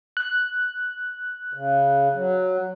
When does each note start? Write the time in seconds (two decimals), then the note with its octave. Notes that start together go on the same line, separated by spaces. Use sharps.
0.17 F#6
1.54 C#3
2.15 F#3